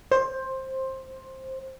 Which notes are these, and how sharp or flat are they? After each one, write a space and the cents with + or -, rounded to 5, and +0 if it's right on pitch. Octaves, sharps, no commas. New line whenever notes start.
C5 +10